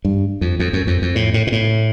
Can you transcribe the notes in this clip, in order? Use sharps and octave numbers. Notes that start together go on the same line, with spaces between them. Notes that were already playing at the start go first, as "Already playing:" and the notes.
G2
F2
F2
F#2
F2
F2
A2
A2
A#2
A2